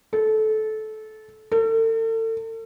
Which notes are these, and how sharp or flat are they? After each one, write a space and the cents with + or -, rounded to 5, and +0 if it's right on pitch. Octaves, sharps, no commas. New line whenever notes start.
A4 -20
A4 +40